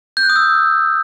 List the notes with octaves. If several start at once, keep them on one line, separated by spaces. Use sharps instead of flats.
G6
F#6
D#6
E6